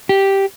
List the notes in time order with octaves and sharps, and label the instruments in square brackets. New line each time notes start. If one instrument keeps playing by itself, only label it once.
[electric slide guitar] G4